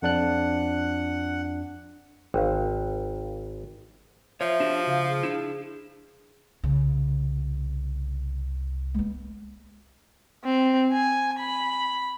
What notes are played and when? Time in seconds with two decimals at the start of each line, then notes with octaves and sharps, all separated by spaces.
0.02 F2 D4 F#5 F#6
2.34 G#1 F5 G5
4.41 F3 C#5 E5
4.60 D4 F#4 G4
4.87 C#3 F5
5.07 G#4
5.23 D4 E4
6.64 C2 C#3
8.94 G#3 B3
10.45 C4
10.93 G#5
11.39 B5